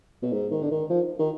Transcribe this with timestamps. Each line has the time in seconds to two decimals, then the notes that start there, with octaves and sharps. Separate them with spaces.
0.23 B2
0.32 G#2
0.51 D#3
0.62 D3
0.71 D#3
0.90 F3
1.19 D#3